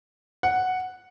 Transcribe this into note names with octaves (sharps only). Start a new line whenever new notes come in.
F#5